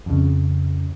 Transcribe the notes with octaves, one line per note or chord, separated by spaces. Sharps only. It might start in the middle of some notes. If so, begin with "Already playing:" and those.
F2 C#3